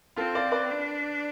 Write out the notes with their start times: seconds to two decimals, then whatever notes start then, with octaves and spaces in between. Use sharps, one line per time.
0.16 C4 F4 A4
0.35 D5 F5
0.52 B4 D5
0.70 D4